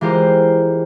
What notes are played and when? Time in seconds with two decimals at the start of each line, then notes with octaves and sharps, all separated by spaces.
0.01 E3 G#3 F4 G4 A#4 C5